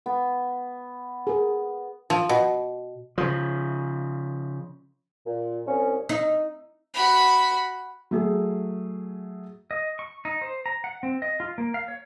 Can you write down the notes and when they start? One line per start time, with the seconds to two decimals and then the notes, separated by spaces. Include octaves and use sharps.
0.06 B3
1.27 G#4 A#4
2.10 F3
2.29 B2
3.18 C#3 F3
5.24 A#2
5.66 C2 C#4
6.09 D#4
6.94 F#4 B5
8.11 F#3 A3 G#4
9.71 D#5
9.99 C#6
10.25 D#4
10.41 C5
10.66 A#5
10.84 F#5
11.03 C4
11.22 D#5
11.40 F4
11.58 A#3
11.74 F5
11.88 C#5